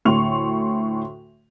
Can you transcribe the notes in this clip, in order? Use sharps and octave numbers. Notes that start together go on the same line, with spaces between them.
D2 A2 C6 C#6 F7